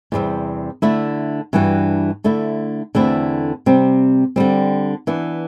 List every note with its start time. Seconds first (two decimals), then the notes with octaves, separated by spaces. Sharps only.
0.12 E2 C3 G3 C4
0.82 D3 A3 E4
1.53 G2 E3 G3 D4 F#4
2.24 D3 A3 E4
2.95 E2 D3 A3 C4 E4
3.66 C3 G3 C4
4.36 D3 G3 C4
5.07 E3 B3 D4